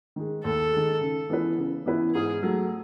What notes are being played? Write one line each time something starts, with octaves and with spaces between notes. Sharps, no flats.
D#3 G#3
D#2 A4
D#3 G#3
C#3
E3 B3 E4 B4
C#3
E3 B3 E4 B4
G#2 G#4
F#3 A3